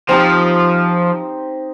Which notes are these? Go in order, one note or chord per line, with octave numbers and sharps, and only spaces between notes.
F3 C4 D#4 G4